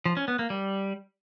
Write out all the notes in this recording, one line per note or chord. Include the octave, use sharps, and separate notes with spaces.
F3
C#4
B3
A#3
G3